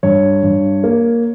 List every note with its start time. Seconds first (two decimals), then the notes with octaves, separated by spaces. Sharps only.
0.03 G2 C#5
0.43 G2
0.84 A#3